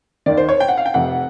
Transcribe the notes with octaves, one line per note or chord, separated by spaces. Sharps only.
D#2 D#3 D5
C5
C#5
G5
F#5
F5
G5
F1 F2 C3 F#5